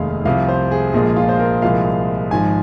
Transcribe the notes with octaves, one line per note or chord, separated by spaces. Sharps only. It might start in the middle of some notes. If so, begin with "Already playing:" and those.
Already playing: F1 D#2 D#3 G#3 F5
C2 C3 F3 F5
C5
G#4
A#1 A#2 F3 G#3 G#4
F4
C5
A#4
C2 A#2 F3 G#3 F5
G#1 G#2 F3 G#5